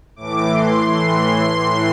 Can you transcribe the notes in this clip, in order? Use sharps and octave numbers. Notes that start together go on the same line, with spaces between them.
A2 E3 D6
C6
A2 E3 C6
A2 E3